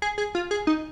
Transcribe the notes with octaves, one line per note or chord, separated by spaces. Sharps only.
G#4
G#4
F4
G#4
D#4